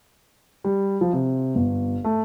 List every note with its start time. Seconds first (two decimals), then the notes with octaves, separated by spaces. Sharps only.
0.64 G3
1.01 F3
1.13 C3
1.55 G1
2.04 A3